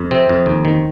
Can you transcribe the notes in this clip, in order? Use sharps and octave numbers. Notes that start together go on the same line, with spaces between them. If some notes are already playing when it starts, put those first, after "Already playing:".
Already playing: F2
C3 C4
F2
D#2
D#3